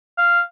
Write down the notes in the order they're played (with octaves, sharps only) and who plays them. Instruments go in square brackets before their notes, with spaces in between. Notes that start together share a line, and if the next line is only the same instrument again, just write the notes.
[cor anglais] F5